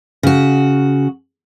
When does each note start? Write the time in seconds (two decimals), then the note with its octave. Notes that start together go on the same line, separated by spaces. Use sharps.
0.23 C#3 F#4